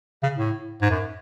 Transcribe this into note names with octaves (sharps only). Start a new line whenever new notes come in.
C#3
A2
G#2
F#2